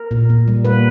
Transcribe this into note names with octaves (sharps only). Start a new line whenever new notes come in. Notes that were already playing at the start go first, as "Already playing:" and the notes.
Already playing: A#4
A#2
A#2
G3
A#3 B4